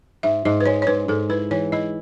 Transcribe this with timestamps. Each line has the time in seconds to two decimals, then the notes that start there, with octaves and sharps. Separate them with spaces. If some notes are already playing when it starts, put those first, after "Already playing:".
0.23 G#2 E5
0.45 G#2 D#5
0.60 B4
0.66 G#3 C#5
0.82 C#5
0.87 G#2 B4
1.08 G#2 A4
1.29 E4 B4
1.51 E3 C#5
1.72 E4 D#5